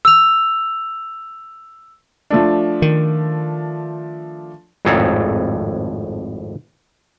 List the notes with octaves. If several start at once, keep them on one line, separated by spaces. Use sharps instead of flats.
E6 F7
F3 A3 D4
D#3
G#1 F2 A2 G#4 A4 A#5